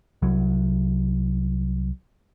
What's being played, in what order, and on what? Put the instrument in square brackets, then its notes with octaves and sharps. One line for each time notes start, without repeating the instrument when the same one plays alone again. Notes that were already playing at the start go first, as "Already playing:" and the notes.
[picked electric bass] C2 F#3